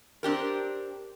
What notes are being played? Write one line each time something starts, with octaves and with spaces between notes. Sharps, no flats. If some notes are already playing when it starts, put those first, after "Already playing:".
C4 D4 G4 A#4